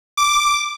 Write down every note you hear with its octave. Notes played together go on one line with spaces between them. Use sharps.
D6